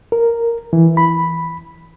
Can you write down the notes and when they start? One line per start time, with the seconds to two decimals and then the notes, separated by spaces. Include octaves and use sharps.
0.12 A#4
0.73 E3
0.97 B5